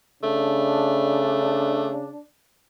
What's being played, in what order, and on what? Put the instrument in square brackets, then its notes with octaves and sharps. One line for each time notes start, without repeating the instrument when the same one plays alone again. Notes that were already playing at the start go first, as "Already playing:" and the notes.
[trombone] C#3 [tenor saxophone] A3 [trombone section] D4